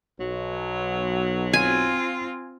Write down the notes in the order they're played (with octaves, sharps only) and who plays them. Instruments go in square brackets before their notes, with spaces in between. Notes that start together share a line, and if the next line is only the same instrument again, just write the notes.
[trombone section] B1 [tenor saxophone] F#3
[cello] C4 F4 [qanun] G#5